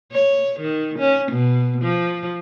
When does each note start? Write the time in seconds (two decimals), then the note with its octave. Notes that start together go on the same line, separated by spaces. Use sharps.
0.12 C#5
0.60 D#3
0.99 C#4
1.32 B2
1.82 F3